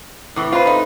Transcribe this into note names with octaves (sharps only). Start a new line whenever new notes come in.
A2 E3
F4 B4 C5
A3 D#4